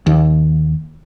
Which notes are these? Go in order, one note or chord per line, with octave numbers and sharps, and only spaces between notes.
D#2